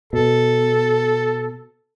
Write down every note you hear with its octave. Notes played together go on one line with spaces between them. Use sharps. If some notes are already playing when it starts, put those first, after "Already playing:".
B2 A4